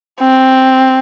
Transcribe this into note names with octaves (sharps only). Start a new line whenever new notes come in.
C4